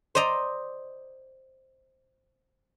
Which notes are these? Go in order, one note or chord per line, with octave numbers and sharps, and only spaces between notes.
C5 D5 D#5 A#5